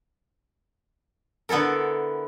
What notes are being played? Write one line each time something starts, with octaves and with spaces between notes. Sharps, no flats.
D3 B3 E4 A4 A#4